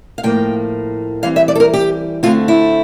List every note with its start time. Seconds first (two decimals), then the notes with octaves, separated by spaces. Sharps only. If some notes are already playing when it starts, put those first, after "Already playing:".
0.18 F5
0.23 A2 F3 A#3 G5
1.23 E3 G3 C4 F5
1.36 E5
1.48 D5
1.55 A4
1.60 A#4
1.74 G4
2.23 D3 A3 C4 F4
2.48 E4